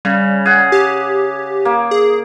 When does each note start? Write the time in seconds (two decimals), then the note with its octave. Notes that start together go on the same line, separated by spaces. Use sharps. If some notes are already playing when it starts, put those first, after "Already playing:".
0.05 C#3 G3
0.46 G#4 F#5
0.72 G4
1.65 A#3
1.91 G#4